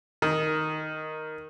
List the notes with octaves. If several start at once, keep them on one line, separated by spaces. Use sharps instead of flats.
D#3